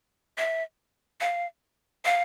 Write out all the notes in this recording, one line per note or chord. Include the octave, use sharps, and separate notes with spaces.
E5
F5
F5